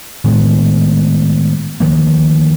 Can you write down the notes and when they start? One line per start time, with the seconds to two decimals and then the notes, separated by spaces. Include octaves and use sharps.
0.24 A2 D#3 G#3 B3
1.80 D2 D#3 F3 A#3